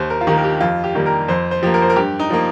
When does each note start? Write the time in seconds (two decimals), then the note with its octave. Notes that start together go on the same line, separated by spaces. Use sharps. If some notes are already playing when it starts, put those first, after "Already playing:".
Already playing: D#2 C5
0.10 A#4
0.21 F4
0.27 D#3 A#3 G4
0.37 A#4
0.44 G4
0.60 F2 F4
0.84 G4
0.95 D#3 G3 A#3
1.06 A#4
1.28 F2 C5
1.51 C5
1.63 F3 A#3 G4
1.74 A#4
1.82 C5
1.90 A#4
1.96 G2 G4
2.19 D#4
2.30 F3 A#3